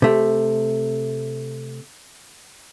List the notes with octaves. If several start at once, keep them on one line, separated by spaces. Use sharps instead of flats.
C3 A3